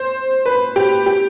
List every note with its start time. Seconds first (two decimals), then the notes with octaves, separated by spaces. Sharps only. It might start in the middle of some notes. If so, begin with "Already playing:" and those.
Already playing: C5
0.46 B4
0.76 G4
1.06 G4